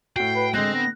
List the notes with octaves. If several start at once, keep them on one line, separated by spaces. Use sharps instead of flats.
A2 F#4 G5 C7
B4
D3 G#3 C4 F#6 A#6
B3 A#6